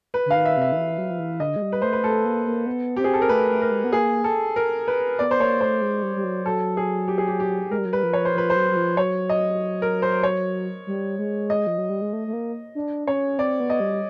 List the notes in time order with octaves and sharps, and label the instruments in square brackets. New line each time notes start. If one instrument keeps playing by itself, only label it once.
[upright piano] B4
[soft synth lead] D3
[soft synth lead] D#3 [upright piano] F5
[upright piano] E5
[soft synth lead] C3 [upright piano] E5
[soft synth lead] D#3
E3
F#3
F3
E3
[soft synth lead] D3 [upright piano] D#5
[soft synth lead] G#3
G3
[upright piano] B4
[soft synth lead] A3 [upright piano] C5
[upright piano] B4
[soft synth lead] A3 [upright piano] A4
[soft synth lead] A#3
A#3
B3
[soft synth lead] C4 [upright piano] G4
[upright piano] G#4
A4
A#4
[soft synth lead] A3 [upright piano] B4
[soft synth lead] A3
[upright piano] A#4
[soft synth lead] G#3
B3
[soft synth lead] A#3 [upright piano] G#4
[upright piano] A4
A#4
B4
[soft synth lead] B3 [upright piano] D5
[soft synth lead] B3 [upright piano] C5
[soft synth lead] A#3 [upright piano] C#5
[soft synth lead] A3 [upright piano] C5
[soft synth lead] G#3
G3
G3
F#3
[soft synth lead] F#3 [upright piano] A4
[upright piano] G#4
G4
G#4
G4
G4
[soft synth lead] G#3 [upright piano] A#4
[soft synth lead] G3
F#3
[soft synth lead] G3 [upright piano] B4
[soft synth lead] F3
[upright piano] C#5
C5
[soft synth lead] F3 [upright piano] B4
[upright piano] C5
[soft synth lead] F#3
F#3
F3
[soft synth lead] F#3 [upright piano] C#5
[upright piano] D#5
A#4
C5
C#5
[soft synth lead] G3
G#3
[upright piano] D#5
[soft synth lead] F3
F#3
G3
G#3
A3
A3
A#3
D4
[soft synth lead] C#4 [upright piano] C#5
[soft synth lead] C4 [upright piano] D5
[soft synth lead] B3
[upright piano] D#5
[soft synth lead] G3